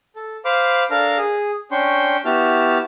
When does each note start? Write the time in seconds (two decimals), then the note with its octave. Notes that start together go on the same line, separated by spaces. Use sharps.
0.16 A4
0.45 C5 F5 B5 D6 F6
0.91 D4 A4 A#4 F5 F6
1.18 G#4
1.71 C#4 D4 G5 C6 C#6
2.25 B3 E4 F#4 G4 A5 F6